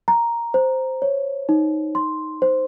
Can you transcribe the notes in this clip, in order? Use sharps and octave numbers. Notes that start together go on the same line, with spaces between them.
A#5
C5
C#5
D#4
C6
C5